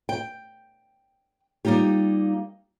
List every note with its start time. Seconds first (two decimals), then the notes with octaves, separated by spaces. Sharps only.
0.09 G5
1.65 G3 A#3 D#4 F4 G4